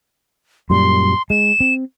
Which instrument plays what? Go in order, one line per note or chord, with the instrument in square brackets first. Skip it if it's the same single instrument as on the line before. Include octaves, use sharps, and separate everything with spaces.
[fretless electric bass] F#2 A#2 G3 [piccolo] C6
[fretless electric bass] G#3 [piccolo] E7
[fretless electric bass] C4